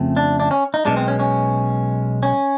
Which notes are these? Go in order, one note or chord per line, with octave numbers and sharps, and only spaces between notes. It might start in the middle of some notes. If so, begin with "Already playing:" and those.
Already playing: F2 C#3 F3 A3 C4
D4
D4
C#4
D#4
B1 B2 G#3 D4
C4
C#4
C#4
C#4